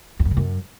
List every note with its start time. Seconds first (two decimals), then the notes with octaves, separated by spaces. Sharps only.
0.20 E2
0.25 F#2
0.31 C#3
0.37 F#2